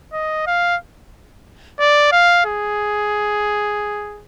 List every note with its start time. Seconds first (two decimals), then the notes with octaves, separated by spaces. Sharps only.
0.13 D#5
0.47 F5
1.80 D5
2.12 F5
2.46 G#4